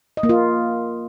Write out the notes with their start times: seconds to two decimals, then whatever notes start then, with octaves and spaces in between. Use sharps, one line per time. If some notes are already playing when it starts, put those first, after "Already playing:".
0.17 D#5
0.23 A#3
0.29 F4